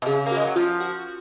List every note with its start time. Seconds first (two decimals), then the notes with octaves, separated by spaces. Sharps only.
0.02 B2
0.06 C#3 G#4
0.26 A#3
0.31 F#4
0.36 G#3
0.45 F#3
0.56 F3 F4
0.80 F#4